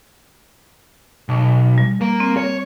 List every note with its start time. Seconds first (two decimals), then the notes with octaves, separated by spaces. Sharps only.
1.29 B1
1.78 G3
2.01 A#3 A#4
2.20 C4
2.37 C#5